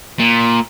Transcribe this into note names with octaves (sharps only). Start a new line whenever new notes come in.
A#2